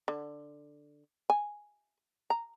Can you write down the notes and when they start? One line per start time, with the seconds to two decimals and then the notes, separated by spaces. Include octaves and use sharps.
0.08 D3
1.30 G#5
2.30 A#5